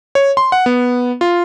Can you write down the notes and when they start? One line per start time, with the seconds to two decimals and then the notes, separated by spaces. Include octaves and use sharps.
0.15 C#5
0.37 C6
0.52 F#5
0.66 B3
1.21 F4